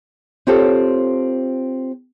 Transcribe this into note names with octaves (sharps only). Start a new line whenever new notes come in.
C4 F4 G4 A4 C5 C#5